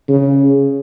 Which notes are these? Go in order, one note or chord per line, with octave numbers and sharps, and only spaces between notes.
C#3